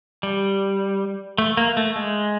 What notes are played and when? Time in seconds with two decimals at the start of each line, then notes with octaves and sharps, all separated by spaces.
0.23 G3
1.38 A3
1.57 A#3
1.77 A3
1.96 G#3